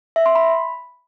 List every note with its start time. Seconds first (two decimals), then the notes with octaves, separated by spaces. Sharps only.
0.16 E5
0.26 C6
0.35 B5